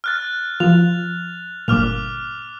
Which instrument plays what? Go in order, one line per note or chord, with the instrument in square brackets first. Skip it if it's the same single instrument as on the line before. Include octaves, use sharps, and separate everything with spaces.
[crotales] F6 F#6 A6
[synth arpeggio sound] F3 [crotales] F7
[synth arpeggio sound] G1 A#2 [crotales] D6 F6 F7